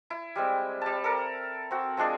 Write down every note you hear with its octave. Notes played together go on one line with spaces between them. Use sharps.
E4
G3 G#3 C4
G3 A5
A4 A#4
C4 F#4
F3 G#3 D4 G#4